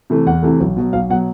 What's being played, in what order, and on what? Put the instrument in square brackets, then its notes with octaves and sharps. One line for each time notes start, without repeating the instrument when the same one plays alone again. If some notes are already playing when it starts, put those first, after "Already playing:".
[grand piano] C3 E3 A3
E2 F#5
C3 E3 A3
B1
B2 F#3
B1 F5
B2 F#3 F#5